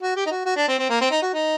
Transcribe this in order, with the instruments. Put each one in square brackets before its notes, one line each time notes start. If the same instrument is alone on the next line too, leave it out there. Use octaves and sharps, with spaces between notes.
[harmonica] F#4
G4
D#4
F#4
F#4
D4
C4
C4
A#3
C4
D#4
F#4
D#4